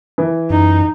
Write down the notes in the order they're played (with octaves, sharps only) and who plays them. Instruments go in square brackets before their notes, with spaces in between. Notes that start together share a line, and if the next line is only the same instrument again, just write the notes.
[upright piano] E3
[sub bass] F#2 [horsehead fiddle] D#4